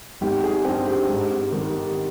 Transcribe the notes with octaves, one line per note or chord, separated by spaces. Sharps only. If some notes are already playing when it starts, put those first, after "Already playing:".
G#1 G4
G#4
G2 G3 C4 G4
G4
G#2
D#3 G3